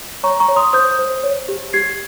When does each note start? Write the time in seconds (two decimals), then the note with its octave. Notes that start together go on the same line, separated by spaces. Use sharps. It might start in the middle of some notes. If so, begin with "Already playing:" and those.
0.23 C#5 A#5 C#6
0.40 A#5 C#6
0.48 C#5
0.56 C6 D#6
0.73 C5 D#6 G6
0.99 C5
1.23 C#5
1.48 G4
1.73 G4 G#6 C7